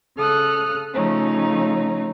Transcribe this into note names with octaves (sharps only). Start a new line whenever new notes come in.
C#3 A4 D#6 F6 F#6
C#3 F3 A3 C#4 D#4